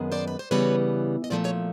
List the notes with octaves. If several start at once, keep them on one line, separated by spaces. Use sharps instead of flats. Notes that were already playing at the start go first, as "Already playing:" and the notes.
Already playing: F#2 D#3 G#3 B3
C5 D5
B4
C5
C#3 E3 G3 B3 B4 C#5
D#5
A#2 F3 A3 C5 D5
C#5 D#5